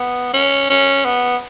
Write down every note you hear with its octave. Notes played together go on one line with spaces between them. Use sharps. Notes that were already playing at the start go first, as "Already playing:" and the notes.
Already playing: B3
C#4
C#4
B3